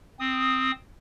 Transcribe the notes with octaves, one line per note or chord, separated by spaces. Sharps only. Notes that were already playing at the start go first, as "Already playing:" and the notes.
C4 D#6